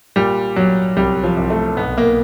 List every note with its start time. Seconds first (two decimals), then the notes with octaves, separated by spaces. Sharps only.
0.16 A#2 G3
0.56 A#2 F#3
0.97 C2 G3
1.24 F3
1.37 C2
1.50 A3
1.77 B1 B3
1.98 A#3